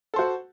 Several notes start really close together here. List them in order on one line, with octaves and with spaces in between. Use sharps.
A4 C5 F#4